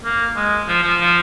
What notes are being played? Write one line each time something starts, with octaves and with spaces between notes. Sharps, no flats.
A#3
G#3
F3
F3
F3